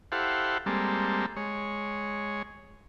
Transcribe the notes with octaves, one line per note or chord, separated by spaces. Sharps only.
E4 G4 A4 C5 F5 F#5
G3 G#3 A#3 C4 A4
G#3 C#5